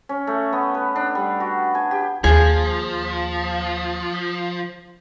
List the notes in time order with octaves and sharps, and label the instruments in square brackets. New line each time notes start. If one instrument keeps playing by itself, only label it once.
[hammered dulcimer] C#4
A3
B3
B4
D4
G3
F#4
G#5
G4
[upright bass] D#2 [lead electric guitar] F3 [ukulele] G#4